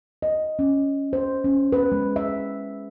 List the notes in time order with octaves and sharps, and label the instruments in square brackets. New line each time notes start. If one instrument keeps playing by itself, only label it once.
[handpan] D#5
C#4
C5
C#4
B4
G#3
E5